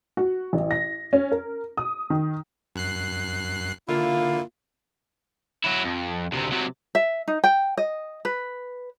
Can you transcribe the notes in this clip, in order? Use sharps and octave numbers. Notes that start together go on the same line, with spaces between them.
F#4
A1
A#6
C#4
A#4
D#6
D#3
F#2 F#6 C7
D3 A#3 E4 F4
F#3 E4
F2
D2 C3
C3 F#3
E5
D#4
G5
D#5
B4